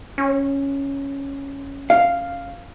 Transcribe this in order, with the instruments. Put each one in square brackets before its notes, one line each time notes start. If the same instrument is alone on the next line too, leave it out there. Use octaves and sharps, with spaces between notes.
[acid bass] C#4
[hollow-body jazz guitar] F5